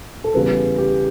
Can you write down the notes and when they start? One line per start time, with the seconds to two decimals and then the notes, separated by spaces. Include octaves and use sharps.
0.24 A4
0.34 E2 C#3 G3 B3 B4
0.78 G4